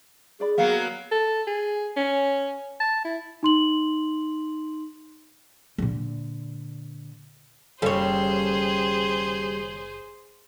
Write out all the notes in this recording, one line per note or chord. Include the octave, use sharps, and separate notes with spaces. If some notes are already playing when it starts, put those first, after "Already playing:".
D4 G#4 D5 B5
F#3 A#3 B3 F#4 F5
A4
G#4
C#4
A5
E4
D#4 C6 F#7
A#2 D3
F#1 D#2 C#3 G3 G#4 A4 C5 C#5